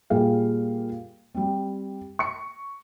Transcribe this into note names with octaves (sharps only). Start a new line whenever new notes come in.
A#2 G3 G#4 F5
G3 C4
C#6 C#7